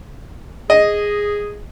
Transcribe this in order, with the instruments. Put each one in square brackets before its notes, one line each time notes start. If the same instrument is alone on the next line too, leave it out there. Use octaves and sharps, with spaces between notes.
[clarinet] G#4 [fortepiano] D#5